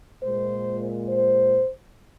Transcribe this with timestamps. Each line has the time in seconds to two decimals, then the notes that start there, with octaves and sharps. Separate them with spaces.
0.23 A#2 G#3 C5
1.09 C5